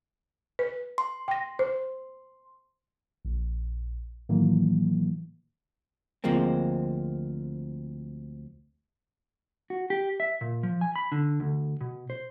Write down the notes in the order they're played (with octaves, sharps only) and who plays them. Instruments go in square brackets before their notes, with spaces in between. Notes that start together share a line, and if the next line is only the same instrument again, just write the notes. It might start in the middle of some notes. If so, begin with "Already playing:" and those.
[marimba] B4
[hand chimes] C6
[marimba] G5 A#6
C5
[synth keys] A#1
A2 D#3 E3 F#3 A#3
[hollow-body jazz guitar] D2 F3 G#3 A#3 C4
[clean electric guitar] F#4
G4
E5
A#2
F3
G#5
B5
D3
D2
B2
C5